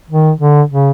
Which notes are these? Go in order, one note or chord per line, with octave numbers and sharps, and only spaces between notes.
D#3
D3
C#3